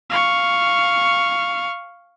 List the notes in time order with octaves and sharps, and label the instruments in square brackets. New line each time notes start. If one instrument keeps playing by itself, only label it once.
[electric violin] F5 C#6